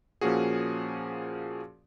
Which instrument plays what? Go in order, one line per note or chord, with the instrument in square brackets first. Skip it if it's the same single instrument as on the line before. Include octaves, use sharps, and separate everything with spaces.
[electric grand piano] A#2 F3 A#3 C#4 F#4 G#4